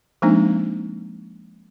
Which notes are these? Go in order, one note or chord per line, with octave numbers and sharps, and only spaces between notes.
F3 G#3 A#3 C4 D4 D#4